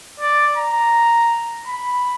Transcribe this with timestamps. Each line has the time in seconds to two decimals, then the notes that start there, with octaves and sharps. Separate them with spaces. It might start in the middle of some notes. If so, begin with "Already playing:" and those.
0.20 D5
0.57 A#5
1.68 B5